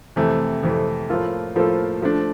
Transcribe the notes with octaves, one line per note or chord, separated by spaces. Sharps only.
F2 C3 E3 A3
F2 C3 E3 A3
A2 F3 A#3 F4 A4
A2 F3 A#3 F4 A4
F3 A3 D4